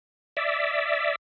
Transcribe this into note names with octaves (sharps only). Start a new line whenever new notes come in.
D5 E5